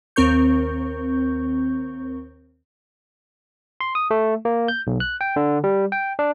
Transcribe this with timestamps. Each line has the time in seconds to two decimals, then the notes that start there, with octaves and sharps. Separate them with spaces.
0.16 D#2 C4 A#4 C#6 G6
3.81 C6
3.95 D#6
4.11 A3
4.45 A#3
4.68 G6
4.87 B1
5.00 F#6
5.21 G5
5.36 D3
5.64 G3
5.92 G5
6.19 D4